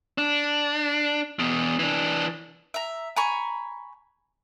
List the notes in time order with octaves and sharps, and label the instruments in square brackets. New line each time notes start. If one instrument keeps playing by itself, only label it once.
[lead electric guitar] D4
E2 B2
E3 D4
[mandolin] E5 A#5
G#5 A#5 B5 C#6